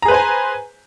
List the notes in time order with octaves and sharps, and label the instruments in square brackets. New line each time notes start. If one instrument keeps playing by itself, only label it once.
[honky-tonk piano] A#5
G#4
B4
C5
G#5